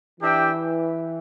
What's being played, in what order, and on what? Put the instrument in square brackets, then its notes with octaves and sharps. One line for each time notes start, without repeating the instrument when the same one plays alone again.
[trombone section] E3 [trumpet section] D4 G4 E5 G5